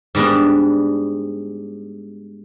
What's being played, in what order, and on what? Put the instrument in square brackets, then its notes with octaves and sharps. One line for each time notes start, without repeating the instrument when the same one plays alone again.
[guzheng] G#2 G3 B3 D4